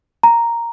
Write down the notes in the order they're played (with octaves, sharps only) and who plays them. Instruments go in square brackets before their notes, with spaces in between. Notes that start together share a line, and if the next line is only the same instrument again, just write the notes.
[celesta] A#5